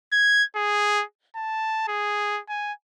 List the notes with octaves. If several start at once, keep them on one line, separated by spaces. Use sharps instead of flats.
G#6
G#4
A5
G#4
G#5